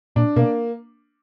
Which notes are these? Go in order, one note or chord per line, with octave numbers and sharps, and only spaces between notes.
A#2 D4
B2 A#3